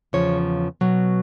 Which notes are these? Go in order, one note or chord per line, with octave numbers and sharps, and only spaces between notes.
E2 C#3 F3 C#5
B2 F#3